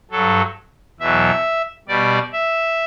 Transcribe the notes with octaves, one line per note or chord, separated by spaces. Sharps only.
G2 F#3 A4
E2 B2 F#3 E5
B2 G3 D5
E5